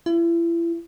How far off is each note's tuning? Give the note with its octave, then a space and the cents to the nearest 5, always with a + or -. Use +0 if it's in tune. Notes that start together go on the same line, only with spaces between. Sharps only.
E4 +35